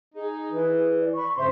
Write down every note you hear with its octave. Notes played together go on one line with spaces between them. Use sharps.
D#4 G#4
E3
D5
B5 C#6
F2 G#2 C#3 C5 E5 C6